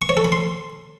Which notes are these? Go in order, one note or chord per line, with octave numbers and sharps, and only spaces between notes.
C#6
C#5
A4
B5
C6